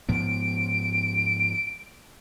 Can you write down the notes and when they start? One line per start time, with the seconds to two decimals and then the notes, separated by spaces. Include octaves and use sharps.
0.09 G#2 F3 B3 D7